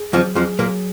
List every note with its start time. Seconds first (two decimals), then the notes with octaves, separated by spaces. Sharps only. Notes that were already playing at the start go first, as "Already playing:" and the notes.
Already playing: G#4
0.13 F2 F3 F#3
0.35 F2 F3 G#4
0.59 A#2 F#3 A#3